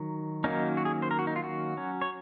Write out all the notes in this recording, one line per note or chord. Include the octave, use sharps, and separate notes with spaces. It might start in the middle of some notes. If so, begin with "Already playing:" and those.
Already playing: D#3 F#3
D#3 F#3 A#3 C#4 D#4
F#4
G#4
C5
A#4
F#4
D#4
F4
F#4
F#3 C#4
C#5